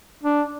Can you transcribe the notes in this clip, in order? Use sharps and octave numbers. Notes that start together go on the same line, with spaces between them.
D4